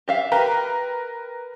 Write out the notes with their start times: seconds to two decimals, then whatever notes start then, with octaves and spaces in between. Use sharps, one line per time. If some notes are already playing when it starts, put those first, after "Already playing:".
0.08 G4 E5 F5
0.32 G4 A#4 B4 A#5